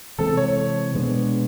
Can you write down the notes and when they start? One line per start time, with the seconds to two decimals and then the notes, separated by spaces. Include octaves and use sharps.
0.18 C3 E3 G#3 C4 A4
0.37 C#5
0.94 B2 G#3 B3 D4